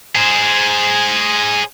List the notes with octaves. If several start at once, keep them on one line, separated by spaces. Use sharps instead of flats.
G#4 C5